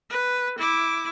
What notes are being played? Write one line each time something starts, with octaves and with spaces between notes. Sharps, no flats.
B4
E4 D6